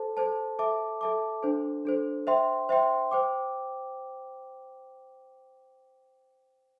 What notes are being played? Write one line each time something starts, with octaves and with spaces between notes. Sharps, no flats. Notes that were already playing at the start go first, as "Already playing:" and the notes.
Already playing: A4 C5 A5
A4 C5 A5
A4 E5 A5 D6
A4 E5 A5 D6
D4 A4 C5
D4 A4 C5
C5 E5 G5 C6
C5 E5 G5 C6
C5 G5 D6